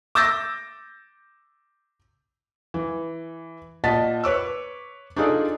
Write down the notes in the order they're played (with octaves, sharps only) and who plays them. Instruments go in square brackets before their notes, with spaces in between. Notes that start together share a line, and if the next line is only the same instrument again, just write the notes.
[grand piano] D6 E6 G6 A6 A#6
[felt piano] E3
A#2 D#5 F#5 A5 A6 B6
B4 C#5 D6 E6
D4 D#4 F4 G#4 A4 D5